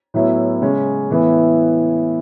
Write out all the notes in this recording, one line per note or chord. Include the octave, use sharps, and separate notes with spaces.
A2 F#3 B3 E4
C#3 G#3 C#4
A2 E3 B3 E4 B4